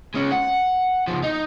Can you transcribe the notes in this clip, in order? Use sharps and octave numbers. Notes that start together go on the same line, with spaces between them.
G#3 C#4
F#5
C#2 F3
D#4